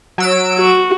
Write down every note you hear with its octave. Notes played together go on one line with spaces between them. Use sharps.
F#3 E6 D7
F#4